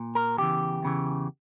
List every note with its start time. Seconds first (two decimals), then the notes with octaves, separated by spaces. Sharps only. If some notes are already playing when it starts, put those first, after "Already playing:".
Already playing: A#2
0.15 A#4
0.37 E2 C#3 E3 G4
0.82 E2 C#3 E3